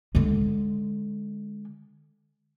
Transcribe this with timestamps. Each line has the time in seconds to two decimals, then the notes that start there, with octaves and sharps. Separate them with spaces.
0.15 D3 G#3